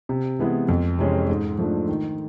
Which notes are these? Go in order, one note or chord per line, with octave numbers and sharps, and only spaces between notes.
C3
E3 G#3 B3 E4
F2
C3 E3 G#3 C#4
G#2
F3 A3 D4
D#3